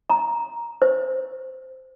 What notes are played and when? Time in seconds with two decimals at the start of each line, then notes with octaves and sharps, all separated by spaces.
0.10 A#5
0.82 C5